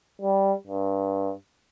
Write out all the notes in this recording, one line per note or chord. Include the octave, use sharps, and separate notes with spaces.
G3
G2